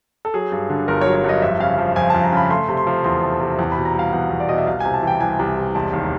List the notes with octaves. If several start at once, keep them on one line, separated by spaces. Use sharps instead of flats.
A4
F#3 G#4
G2
D3
G1 A#4
C#5
F#3
C#5
G2 D#5
F2 E5
C#3 F5
F3
F2 G#5
A5
F2
A#5
C#3 B5
A3 C6
C3
C6
F3
E2 C6
A3
C3
E2
B5
B2
A#5
G3 F5
E2 F#5
E2
D5
B2 D#5
E5
C2 F5
G#5
C3
A5
E3 G5
C2 G#5
C2
C3
E1 A5
D#2